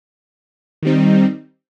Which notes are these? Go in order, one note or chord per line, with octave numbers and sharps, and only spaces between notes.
D#3 G3 C4 D#4